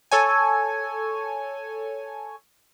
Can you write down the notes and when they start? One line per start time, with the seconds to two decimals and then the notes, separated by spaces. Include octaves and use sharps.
0.11 A4 C#5 G#5